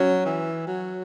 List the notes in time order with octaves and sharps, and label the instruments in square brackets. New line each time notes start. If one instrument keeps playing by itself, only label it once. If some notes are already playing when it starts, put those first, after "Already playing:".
Already playing: [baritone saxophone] F#3 [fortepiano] C#4
[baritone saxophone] E3
F#3